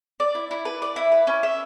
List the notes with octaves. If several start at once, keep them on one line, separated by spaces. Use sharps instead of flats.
D5
E4
E4
B4
D5
E4
B4
C#4
E5